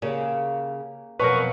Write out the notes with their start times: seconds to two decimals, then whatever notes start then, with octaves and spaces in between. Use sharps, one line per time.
0.02 C#3 A#3 G4 F#5
1.19 F2 B2 F#3 A#4 B4 F5 C#6